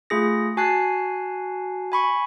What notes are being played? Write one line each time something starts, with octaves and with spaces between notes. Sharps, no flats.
A3 F4 G#4 A#6
F#4 G#5 A5 F#6 C7
G#5 B5 C#6